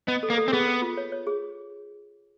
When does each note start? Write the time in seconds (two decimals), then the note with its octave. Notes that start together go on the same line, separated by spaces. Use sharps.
0.08 B3 D#5
0.23 A4
0.30 A#3
0.38 A4
0.48 C4
0.52 B3 G#4
0.68 B4
0.82 F4
0.97 C#5
1.12 C#5
1.27 G#4